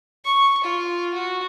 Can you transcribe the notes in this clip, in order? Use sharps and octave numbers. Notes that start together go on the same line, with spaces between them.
C#6
F4
F#4